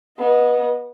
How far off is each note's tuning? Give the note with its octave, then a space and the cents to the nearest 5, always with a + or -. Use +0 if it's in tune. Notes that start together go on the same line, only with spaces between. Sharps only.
B3 -20 D#5 +0